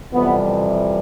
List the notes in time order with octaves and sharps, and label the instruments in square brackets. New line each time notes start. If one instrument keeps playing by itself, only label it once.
[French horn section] F2 C3 E3 G3 B3